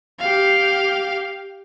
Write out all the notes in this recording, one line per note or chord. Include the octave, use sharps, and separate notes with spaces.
G4 F5